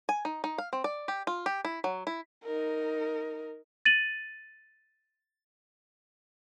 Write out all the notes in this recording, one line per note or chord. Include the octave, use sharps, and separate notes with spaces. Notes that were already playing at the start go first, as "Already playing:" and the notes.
G#5
D#4
D#4
F5
C4
D5
G4
F4
G4
E4
F#3
E4
D#4 A#4
A6 D#7 F#7